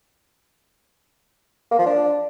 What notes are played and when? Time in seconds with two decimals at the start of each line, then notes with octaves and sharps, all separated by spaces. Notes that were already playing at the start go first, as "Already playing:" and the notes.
1.71 A#3
1.79 F3
1.86 D4